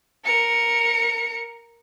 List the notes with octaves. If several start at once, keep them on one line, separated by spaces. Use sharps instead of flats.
A#4 C#7